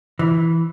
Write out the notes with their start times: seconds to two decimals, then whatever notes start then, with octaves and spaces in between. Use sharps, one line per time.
0.19 E3